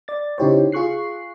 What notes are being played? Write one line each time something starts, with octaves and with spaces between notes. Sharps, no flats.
D5 A6
C#3 D#4 E4 G4 C5 C#5
F4 G#4 C#6 F#6 C7